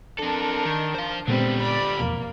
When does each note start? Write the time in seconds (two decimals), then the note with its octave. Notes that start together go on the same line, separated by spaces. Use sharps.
0.19 C4 D4 A4 A#4
0.66 D#3
0.95 C5 F5
1.28 A#2 D3 G3 G#3 B3 C4
1.62 D5 B5
2.00 E1 B1 F2 A#3